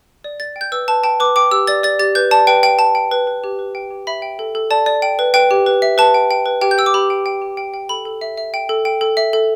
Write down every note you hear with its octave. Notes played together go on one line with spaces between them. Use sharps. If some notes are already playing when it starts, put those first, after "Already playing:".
D5
D5 A6
G5
G6
B4 E6
B4 A5
G5 A5
B4 D6
G5 D6
G4 E6
D5 A6
D5 A6
G4 A6
B4 G6
D5 A5
B4 G5
G5
G5 A5
G5
B4
B4
G4
B4
G5
G4
E5 B5
G5
A4
A4
D5 A5
D5
G5
B4
B4 G5
G4
B4
E5
B4 A5
G5
G5
B4
G4 G5
G6
G5 E6
D6
G4 B5
G5
G5
G4
G5
G5
A4 B5
A4
E5
E5
G5
A4
G5
A4
E5
A4